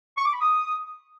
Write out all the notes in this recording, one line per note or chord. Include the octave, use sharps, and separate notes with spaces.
C#6
D6
B5
D#6